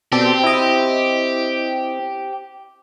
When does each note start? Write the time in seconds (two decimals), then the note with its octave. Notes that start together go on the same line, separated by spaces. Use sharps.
0.12 B2 C4 G4 A4 D5
0.44 E4 D#5